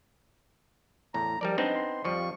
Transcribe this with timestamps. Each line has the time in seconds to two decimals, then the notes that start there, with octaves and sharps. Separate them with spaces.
1.14 E2 A2 A#5
1.41 F3 G3 A#4 D5
1.58 B3 C4 D4 D#4
1.75 C6
2.05 F2 F3 G3 C#6